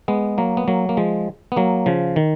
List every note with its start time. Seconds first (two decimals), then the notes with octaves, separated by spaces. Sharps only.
0.08 G#3 B3
0.38 F#3 A#3
0.57 B3
0.68 F#3 A#3
0.89 A#3
0.97 F3 G#3
1.52 B3
1.56 F#3 A#3
1.86 C#3 F3
2.16 D#3